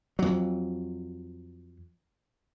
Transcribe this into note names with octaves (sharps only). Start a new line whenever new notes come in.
F2 F#3